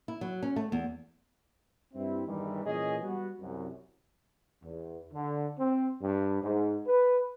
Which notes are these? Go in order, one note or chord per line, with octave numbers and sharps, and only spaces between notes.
E4
F#3
C#4
A3
E2
G2 C4 E4
E2 G2 D#3 E3 G3
A#2 E3 C#4 G#4 D#5
G3 B3 F#4
C2 F#2
E2
D3
C4
G2
G#2
B4